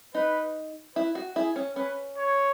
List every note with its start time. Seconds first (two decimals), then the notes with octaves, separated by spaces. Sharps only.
0.14 D#4 B4
0.95 E4 B4
1.15 F#4
1.36 E4 G#4
1.56 C#4
1.76 C#4 B4
2.17 C#5